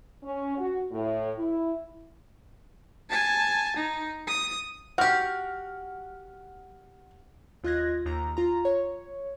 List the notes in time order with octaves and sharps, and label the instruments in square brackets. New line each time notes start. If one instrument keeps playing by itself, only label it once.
[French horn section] C#4
F#4
A2
E4
[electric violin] G#5 A5
D#4
D#6
[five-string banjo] F#4 G4 [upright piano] F#5 F6
[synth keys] D#2 F4 D#5 F#6 G#6 A#6
D#2 A#5
F4 A#5
C#5